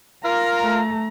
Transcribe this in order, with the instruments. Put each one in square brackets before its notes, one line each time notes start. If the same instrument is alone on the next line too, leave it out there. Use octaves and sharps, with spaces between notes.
[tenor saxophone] F4 [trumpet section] A#4 [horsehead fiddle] A#5
[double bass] A3